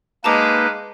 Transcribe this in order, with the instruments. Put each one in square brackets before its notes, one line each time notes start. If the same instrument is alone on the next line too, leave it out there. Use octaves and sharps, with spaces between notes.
[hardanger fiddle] G#3 [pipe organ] A#3 D#4 B4 [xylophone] A5 A#5 D6